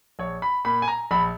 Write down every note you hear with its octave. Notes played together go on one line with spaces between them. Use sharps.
A#1 C#5
B5
A#2 B5
G#5
A#5
A#1 B5